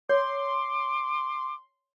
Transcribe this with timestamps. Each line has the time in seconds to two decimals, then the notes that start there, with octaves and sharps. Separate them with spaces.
0.09 C#5 C6 D6